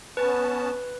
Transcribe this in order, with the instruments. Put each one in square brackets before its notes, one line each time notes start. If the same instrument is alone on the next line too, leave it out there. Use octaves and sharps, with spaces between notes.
[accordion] B3 C#4 A5 [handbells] B4